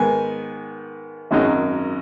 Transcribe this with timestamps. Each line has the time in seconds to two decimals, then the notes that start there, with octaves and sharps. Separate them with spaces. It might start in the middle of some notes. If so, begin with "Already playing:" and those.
Already playing: G#2 D#3 B3 G#5
1.31 G#1 F#2 F#3 D#4